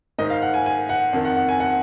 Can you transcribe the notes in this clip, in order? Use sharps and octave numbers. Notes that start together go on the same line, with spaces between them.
G#2 D#3 D#5
F5
F#5
G#5
G#5
F#5
F2 D#3
F#5
F#5
G#5
F#5